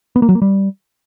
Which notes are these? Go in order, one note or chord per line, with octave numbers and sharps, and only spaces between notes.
B3
A#3
F#3
A#3
G3